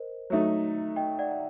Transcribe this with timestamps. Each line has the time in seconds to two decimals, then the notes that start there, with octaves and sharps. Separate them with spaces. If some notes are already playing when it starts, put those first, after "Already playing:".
Already playing: A#4 C5 D#5
0.30 F#3 A3 D#4
0.96 D#5 G5
1.19 D5 F#5
1.31 F#5